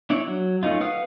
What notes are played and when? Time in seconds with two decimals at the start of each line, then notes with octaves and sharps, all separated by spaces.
0.10 D4 E4 C#5 D5
0.27 F#3
0.63 A3 C#4 D#4 F4
0.81 B4 F5 F#5 D#6 F6